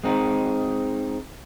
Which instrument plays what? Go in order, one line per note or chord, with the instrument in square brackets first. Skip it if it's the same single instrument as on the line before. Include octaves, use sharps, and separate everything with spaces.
[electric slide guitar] G#3 C4 D#4